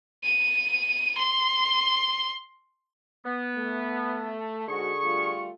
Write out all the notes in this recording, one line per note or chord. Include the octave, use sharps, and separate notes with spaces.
D#7
C6
B3
A3
G#2 D3 F#4 G#4 C#6
G3 A3 F4